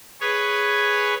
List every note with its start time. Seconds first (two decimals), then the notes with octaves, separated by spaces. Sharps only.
0.21 G#4 B4 C#5